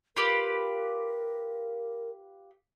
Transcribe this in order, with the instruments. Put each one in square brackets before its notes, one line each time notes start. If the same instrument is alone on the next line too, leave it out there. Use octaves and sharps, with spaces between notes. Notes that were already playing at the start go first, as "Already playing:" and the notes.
[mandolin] F4 G4 B4 [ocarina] A#4